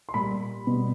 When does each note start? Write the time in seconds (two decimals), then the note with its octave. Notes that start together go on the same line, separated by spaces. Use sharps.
0.09 C6
0.14 A#2 G3 B5
0.67 B2 G3